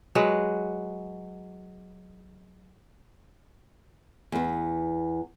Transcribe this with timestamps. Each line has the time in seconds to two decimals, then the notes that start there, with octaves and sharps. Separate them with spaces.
0.15 F#3 G#3 B4
4.32 E2 B3